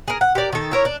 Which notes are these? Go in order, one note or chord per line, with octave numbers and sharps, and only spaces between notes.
G#4 A#4
F#5
G4 A#4 D5
D#3 A4
E4 A#4 C#5
D4